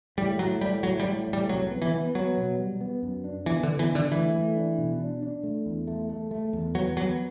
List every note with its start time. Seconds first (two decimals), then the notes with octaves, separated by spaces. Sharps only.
0.18 A2 G3
0.39 A2 F#3
0.61 A2 G3
0.83 A2 F#3
1.00 G3
1.05 A2
1.28 A2
1.33 G3
1.49 C2 F#3
1.71 B3
1.82 E3
1.94 B3
2.15 F#3 B3
2.37 B2
2.59 G3
2.81 B3
3.03 F#2
3.24 D4
3.46 E3 B3
3.63 D3
3.68 B3
3.79 E3
3.90 D4
3.95 D3
4.12 E3 A3
4.34 A3
4.56 D4
4.78 B2
5.00 D4
5.22 D4
5.43 A3
5.66 E2
5.87 A3
6.09 A3
6.31 A3
6.53 E2
6.75 F#3 B3
6.97 F#3 B3